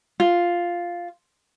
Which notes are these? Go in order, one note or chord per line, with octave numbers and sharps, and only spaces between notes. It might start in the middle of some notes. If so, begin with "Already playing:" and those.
F4